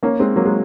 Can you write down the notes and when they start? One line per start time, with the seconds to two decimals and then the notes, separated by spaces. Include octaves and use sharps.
0.03 A#3 C#4
0.20 G#3 C4
0.36 F#3 A#3
0.45 G#3